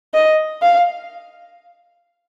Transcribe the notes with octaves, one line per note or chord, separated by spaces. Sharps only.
D#5
F5